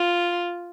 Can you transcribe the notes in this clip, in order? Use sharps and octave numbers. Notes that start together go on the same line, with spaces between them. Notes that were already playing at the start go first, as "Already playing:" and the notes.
Already playing: F4